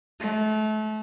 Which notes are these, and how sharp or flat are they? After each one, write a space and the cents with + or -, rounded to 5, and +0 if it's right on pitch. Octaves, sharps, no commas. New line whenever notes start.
A3 -30